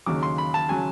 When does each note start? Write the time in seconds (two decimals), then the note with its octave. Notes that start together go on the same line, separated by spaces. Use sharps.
0.06 D#2 C#3 F#3 D6
0.23 C6
0.38 B5
0.54 A5
0.69 C#3 F#3 G#5